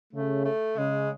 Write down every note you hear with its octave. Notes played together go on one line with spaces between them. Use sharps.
C#3 A3
A3
C#3 G#3